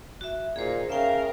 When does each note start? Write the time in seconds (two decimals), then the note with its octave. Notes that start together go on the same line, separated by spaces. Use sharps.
0.21 F#4 E5
0.56 A#2 D#4 G#4 C5
0.90 C#3 A#4 E5 F5 G5